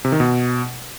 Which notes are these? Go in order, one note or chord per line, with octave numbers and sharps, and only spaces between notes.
C3
D#3
B2